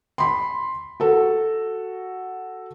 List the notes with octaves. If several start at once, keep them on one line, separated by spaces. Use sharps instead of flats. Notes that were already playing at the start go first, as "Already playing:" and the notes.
B5 C6
F#4 A4